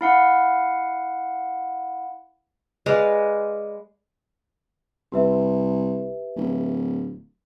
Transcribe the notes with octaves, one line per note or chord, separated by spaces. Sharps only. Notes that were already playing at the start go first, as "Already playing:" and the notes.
E4 F5 F#5
G#3 B4 D5 F5
C2 G4 B4 E5
D1